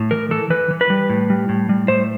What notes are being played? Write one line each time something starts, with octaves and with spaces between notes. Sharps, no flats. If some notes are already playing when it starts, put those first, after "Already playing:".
Already playing: A2
E3 A#4
E3 A4
E3 B4
E3
B4
G3
A2
G3
A2
G3
A2 C5